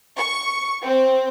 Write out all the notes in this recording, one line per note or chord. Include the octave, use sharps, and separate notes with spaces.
C#6
C4